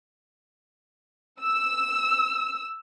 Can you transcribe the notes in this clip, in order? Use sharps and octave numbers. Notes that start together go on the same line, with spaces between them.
E6